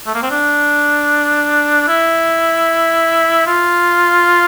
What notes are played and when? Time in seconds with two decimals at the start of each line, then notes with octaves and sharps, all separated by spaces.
0.07 A3
0.15 A#3
0.22 C4
0.30 D4
1.88 E4
3.46 F4